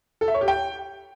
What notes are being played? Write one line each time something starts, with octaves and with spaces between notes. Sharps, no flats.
A4
E5
C#5
G4
G5